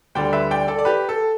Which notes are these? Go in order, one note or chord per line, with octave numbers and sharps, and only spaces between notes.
D2 D3 G3 D5 G5
B4 E5
D5 G5
A4 D5
D5
G4 B4
A4